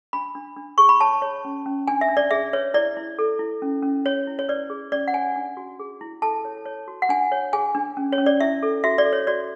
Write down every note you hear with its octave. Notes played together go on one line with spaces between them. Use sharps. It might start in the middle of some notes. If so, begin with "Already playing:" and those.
D4 B5
D4
D4
G#4 C#6
B5
C#5 A5
C#5
C#4
C#4
D4 G#5
E5
D4
D5
G#4 E5
B4 C#5
E4 D5
E4
A4
E4
C#4
C#4
C#5
E4
C#5
B4 D5
G#4
C#4 D5
F#5
C#5 G#5
D4
F#4
G#4
E4
A4 A5
C#5
C#5
F#4
F#5
D4 G#5
C#5
G#4 G#5
D4
C#4
C#5
C#4
D5
E4 E5
A4
F#4 E5
D5
A4
C#5
F#4 D5